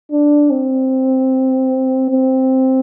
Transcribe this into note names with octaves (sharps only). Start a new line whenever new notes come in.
D4
C4
C4